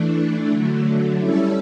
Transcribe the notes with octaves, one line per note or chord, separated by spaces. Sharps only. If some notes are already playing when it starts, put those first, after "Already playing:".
Already playing: E3 A3 D4
D3 F#3 A3
G3 C#4 E4 A4